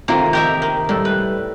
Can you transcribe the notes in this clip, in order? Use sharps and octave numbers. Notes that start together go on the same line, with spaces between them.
C3 D#3 A#3 C4 F4 A4
G4 A#4 D#5 E5 G6
D#3
A2 G3 E6
B4